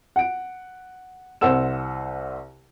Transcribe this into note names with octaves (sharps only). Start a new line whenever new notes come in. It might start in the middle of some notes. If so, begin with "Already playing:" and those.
F#5 D7
C2 C5 F#5 E6 E7